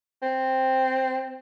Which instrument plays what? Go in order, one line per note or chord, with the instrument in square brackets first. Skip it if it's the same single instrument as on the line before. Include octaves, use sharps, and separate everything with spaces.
[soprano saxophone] C4